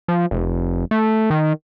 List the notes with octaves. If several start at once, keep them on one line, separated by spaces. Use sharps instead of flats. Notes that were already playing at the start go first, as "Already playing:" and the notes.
F3
F1
A3
D#3